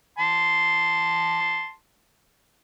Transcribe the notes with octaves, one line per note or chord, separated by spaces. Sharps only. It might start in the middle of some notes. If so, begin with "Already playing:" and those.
A5 C6